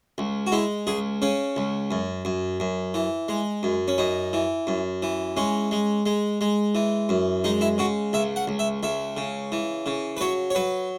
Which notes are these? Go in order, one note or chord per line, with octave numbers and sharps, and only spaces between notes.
C#2
F#4
G#3 E4
C#2 G#4
C#3 C#4
C#2
F#2
F#2
F#2
E3
G#3
F#2
C#4
F#2 D#4
E3
F#2
E3
G#3 C#4
G#3
G#3
G#3
E3
F#2
G#3 D#4
E4
C#3 F#4
C#2 E5
F#5
C#2
E5
C#2 E5
C#3
E3
C#3
B4
F#3 C#5
C#5
F#3 B4